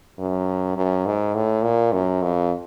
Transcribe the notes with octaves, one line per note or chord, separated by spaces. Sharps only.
F#2
F#2
G#2
A2
A#2
F#2
F2